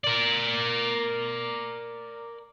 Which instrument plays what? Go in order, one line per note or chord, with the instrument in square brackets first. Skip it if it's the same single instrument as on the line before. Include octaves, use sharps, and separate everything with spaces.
[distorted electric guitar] A#4 D5